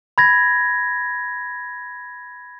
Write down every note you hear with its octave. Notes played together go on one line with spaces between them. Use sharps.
B5 G#6 A#6